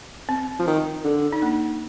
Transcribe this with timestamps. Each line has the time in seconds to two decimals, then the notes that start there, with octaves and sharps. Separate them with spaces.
0.29 C4
0.59 F3
0.67 D#3
1.04 D3
1.33 D#4
1.42 A#3 D4